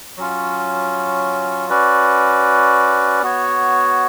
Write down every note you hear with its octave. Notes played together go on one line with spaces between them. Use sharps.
F#3 C#4 F4
C#4 F#4 B4 D5
B3 F#4 C#5